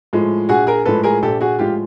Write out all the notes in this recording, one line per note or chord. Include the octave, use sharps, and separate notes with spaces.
A2 F3 G#3
A#1 F#4 G#4
G#4 A#4
A2 F3 G#3 A4 B4
G#4 A#4
A#1 G4 A4
F#4 G#4
A2 F3 G#3 F4 G4